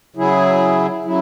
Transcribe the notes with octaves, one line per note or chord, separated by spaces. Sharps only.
C#3 F#3 E4 G#4
C#3 F#3 E4